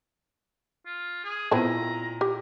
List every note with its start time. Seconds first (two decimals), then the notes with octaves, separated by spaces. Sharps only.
0.86 F4
1.24 G#4
1.51 A#2 B3 C4 E4 A5 A#5 D#7
2.21 G4